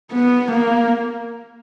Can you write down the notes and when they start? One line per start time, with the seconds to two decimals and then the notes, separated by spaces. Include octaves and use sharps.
0.13 B3
0.51 A#3